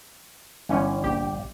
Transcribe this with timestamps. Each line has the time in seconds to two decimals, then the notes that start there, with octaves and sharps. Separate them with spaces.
0.69 G1 E3 C#4
1.04 A#1 G4